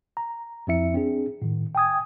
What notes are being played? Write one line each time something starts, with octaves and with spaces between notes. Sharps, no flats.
A#5
F2 F3 C4 E4 E5 C#7
C4 D4 G#4
A2 D#3
G5 G#5 D#6 G#6